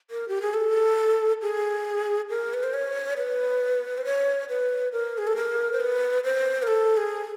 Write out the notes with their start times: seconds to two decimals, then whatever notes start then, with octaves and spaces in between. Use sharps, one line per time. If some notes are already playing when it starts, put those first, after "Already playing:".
0.11 A#4
0.28 G4
0.42 G#4
0.54 A4
1.42 G#4
2.30 A#4
2.54 B4
2.63 C5
2.74 C#5
3.17 B4
3.98 C5
4.05 C#5
4.49 B4
4.92 A#4
5.18 G#4
5.27 A4
5.36 A#4
5.72 C5
5.80 B4
6.24 C5
6.63 A#4
6.68 A4
6.97 G#4